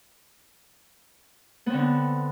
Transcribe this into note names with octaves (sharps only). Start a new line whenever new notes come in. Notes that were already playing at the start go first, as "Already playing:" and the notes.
D3 B3 C4